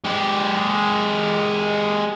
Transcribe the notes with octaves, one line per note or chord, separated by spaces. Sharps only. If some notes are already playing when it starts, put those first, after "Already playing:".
G#3 G4